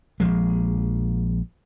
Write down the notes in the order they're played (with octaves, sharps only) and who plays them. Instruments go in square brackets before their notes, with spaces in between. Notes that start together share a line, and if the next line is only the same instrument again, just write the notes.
[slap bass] A#1 F3 G#3